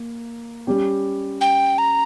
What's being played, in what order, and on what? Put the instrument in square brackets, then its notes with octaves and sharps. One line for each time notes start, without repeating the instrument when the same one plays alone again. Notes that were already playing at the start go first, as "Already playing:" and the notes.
Already playing: [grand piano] A#3
G3 C#4 G4
[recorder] G5
A#5